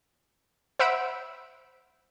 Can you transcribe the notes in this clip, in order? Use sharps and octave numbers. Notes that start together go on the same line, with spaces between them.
C5 E5 F#5 B5 E6 D7